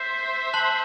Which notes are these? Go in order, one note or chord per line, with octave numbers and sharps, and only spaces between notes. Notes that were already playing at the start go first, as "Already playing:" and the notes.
Already playing: C5 E5 G6 C7 E7
A5 C6 F#6